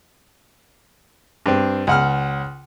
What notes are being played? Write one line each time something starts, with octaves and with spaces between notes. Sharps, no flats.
G2 C4
C#2 F#5 F6